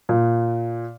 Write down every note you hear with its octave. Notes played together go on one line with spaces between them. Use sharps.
A#2